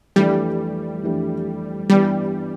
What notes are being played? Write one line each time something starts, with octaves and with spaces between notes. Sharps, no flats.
F2 E3 G3 A3 D4 G4
F2 E3 A3 D4 G4
G2 E3 G3 B3